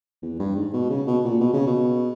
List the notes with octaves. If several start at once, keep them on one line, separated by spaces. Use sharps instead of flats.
E2
G2
G#2
B2
C#3
B2
A#2
B2
C#3
B2